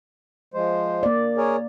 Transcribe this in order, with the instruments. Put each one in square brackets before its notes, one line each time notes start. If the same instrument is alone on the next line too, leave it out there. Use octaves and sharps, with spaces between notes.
[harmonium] F3 G#3 C5
[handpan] A#3 D5
[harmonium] G#4 A#4 C#5